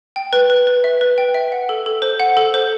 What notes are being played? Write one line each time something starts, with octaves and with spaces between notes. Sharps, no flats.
G5
B4
B4
B4
E5
B4
G5
E5
F#5
A4
A4
C5
F#5
A4
C5